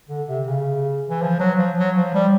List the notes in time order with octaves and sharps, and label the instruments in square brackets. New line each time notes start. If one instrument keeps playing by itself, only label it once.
[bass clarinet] D3
C3
C#3
E3
F3
F#3
F3
F#3
F3
G3